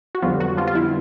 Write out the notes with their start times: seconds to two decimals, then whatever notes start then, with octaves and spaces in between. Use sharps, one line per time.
0.15 F#4
0.22 F2 D3 F3 G3 B3 F4
0.40 F#3 F#4
0.57 F3 F4
0.67 F4
0.75 E4